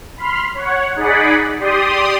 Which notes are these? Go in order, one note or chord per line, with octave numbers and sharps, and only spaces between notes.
B5 C6 F6
C#5 F#5
D#4 G#4 D5 F#5 B5
G4 D5 C6 D#6